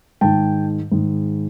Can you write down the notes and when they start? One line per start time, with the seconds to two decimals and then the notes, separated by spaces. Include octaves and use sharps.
0.21 G#2 D#3 G#3 G5 A5
0.92 G#2 D#3 G#3